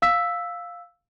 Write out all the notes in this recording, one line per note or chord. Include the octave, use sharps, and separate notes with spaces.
F5 E6 B6